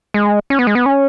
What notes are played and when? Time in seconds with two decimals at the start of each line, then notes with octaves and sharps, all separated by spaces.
0.14 G#3
0.50 C#4
0.59 B3
0.67 G#3
0.75 B3
0.86 C#4